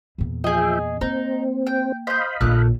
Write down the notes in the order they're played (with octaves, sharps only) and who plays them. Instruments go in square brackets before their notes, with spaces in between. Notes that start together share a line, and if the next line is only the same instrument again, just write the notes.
[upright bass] E2 A#2
[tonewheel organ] F3 E5 G5 [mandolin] G#4 D#5
[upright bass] A#3 [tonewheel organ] C4 [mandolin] D#4
[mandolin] G5
[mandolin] C5 G6 [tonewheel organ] D#5 F5 B5
[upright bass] A#1 D3 [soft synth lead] A#2 [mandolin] A3 A#3 F#6